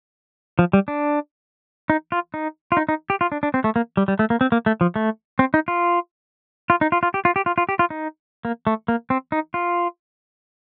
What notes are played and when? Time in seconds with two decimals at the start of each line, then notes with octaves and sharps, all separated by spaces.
0.59 F3
0.73 G3
0.88 D4
1.90 D#4
2.12 F4
2.34 D#4
2.72 F4
2.77 D#4
2.89 D#4
3.10 G4
3.21 F4
3.32 D4
3.43 D4
3.54 C4
3.64 A3
3.76 A#3
3.97 G3
4.08 G3
4.19 A3
4.30 A#3
4.41 C4
4.52 A#3
4.66 A3
4.81 F3
4.96 A3
5.39 C4
5.54 D#4
5.68 F4
6.70 F4
6.81 D#4
6.92 F4
7.03 F4
7.14 G4
7.25 F4
7.36 G4
7.46 F4
7.58 F4
7.69 G4
7.79 F4
7.90 D#4
8.45 A#3
8.67 A3
8.88 A#3
9.10 C4
9.32 D#4
9.54 F4